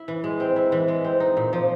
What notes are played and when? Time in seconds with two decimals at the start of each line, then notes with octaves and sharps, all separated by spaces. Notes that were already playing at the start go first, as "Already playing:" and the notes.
Already playing: E4
0.08 E3
0.24 G#3
0.40 C4
0.56 E4
0.72 E3
0.88 G#3
1.04 C4
1.20 D#4
1.37 A#2
1.53 F3